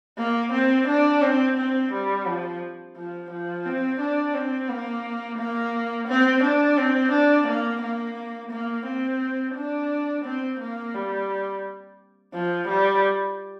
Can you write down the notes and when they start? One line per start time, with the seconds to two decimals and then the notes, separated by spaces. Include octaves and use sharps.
0.18 A#3
0.52 C4
0.88 D4
1.22 C4
1.57 C4
1.92 G3
2.26 F3
2.96 F3
3.31 F3
3.65 C4
4.00 D4
4.34 C4
4.69 A#3
5.38 A#3
6.08 C4
6.43 D4
6.78 C4
7.12 D4
7.47 A#3
7.81 A#3
8.51 A#3
8.86 C4
9.55 D4
10.24 C4
10.60 A#3
10.94 G3
12.33 F3
12.68 G3